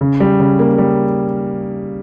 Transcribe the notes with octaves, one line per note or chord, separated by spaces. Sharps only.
C#3
G3
C#3
A#3
G3